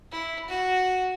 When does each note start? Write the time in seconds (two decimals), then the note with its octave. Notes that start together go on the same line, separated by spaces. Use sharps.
0.11 E4
0.49 F#4